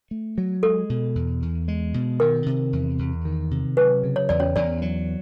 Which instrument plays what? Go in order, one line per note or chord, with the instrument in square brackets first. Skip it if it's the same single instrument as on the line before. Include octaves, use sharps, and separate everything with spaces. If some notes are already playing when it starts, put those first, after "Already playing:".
[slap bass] A3
F#3
[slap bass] G#3 [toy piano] A4
[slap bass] B2
E2
E2
G#3
B2
[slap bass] D#3 [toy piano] A#4
[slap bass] C3
E2
E2
D#3
C3
[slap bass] F#3 [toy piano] B4
[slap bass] C#3
[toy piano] C#5
[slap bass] E2 [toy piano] D5
[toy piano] C#4 C#5
[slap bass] E2 [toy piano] D4 D5
[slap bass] F#3